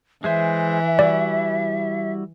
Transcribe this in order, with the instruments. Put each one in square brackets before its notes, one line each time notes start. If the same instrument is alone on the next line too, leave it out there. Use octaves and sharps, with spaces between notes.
[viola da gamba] E3 [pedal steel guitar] G#3 G#4 C5 [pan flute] E5
[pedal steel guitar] G3 E4 F#4 [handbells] D5